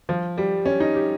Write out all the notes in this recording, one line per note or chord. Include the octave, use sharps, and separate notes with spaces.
F3
G3
C#4
D#4
G4